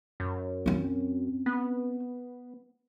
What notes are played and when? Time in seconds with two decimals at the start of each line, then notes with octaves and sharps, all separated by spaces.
0.20 F#2
0.66 C4 C#4
1.46 B3